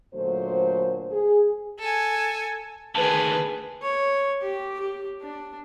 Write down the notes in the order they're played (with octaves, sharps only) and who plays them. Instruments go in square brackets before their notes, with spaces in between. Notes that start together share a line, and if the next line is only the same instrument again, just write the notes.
[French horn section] A#2 D3 F#3 A3 C5
G#4
[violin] A4 G#5
[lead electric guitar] D2 D#3 [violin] G#4 B4 [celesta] A5
[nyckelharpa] C#5
G4
G4
D4